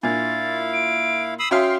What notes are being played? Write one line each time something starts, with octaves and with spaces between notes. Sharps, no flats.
A#2 D4 E4 C5 F5 A6
D7
B5 D#6 E6 C7
C#4 F#4 E5 F5 G5 C6 D#6